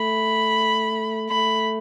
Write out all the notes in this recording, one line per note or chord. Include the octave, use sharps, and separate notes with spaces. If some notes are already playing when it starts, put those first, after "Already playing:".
Already playing: A3 B5
A3 B5